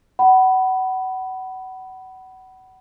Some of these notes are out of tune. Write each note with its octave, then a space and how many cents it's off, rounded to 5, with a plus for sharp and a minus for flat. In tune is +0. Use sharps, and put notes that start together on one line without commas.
F#5 +30 B5 +0